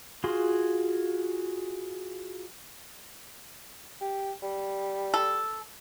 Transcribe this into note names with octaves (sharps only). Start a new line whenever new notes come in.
F4 F#4 G#4 C6
G4
G3
A4